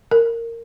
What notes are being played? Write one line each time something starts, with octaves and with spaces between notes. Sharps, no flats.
A#4